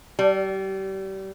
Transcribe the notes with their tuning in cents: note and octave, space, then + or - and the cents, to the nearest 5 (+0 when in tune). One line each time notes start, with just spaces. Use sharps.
G3 -30